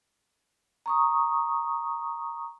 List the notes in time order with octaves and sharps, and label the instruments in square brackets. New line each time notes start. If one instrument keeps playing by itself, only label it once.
[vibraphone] A#5 C#6 D#6